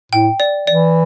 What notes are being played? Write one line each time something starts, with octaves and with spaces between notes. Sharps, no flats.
A2 G5
D5
E3 D5